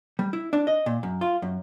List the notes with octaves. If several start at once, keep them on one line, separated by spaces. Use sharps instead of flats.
G3
E4
D4
D#5
A#2
F#2
F4
F#2